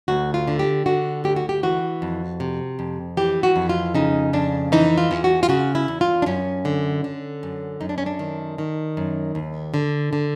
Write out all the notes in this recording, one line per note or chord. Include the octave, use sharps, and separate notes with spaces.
D2 F#4
F4
D3
G4
D3 F#4
D2 G4
F#4
G4
E3 F#4
F2
C3
F2
E3 G4
F#4
F2
F4
C#3 D#4
F2 D4
E3 D#4
F4
E2
F#4
F4
C#3 F#4
E4
E2
F4
D4
F#2 C#4
D3
D3
F#2
F#2 D#4
D4
C#4
D4
D#3
D#3
F#2
D#2
D3
D3